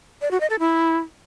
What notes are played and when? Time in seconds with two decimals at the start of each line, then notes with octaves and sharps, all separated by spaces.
0.22 D5
0.31 F#4
0.41 D#5
0.50 A4
0.59 E4